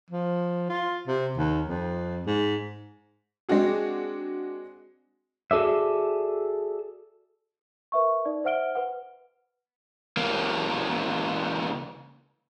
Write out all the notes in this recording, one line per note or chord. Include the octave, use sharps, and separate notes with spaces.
F3
F4
C3
D#2
F2
G#2
G#3 C4 D4 F#4 G#4
F#4 G#4 A4 D5 E5
A#4 B4 E5 C#6
D#4 D5
C5 E5 F#5 F6 D7 G7
B4 F#5
C#2 A#3